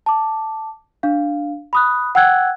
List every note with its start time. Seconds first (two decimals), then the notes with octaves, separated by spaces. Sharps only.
0.06 A5 D6
1.03 D4 F5
1.73 B5 D#6 F#6
2.15 F#5 G5 E6 F#6 G#6